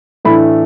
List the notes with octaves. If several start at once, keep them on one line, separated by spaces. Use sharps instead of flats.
A2 E3 A3 D4 B5